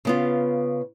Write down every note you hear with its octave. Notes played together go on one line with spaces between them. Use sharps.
C#3 B3 F4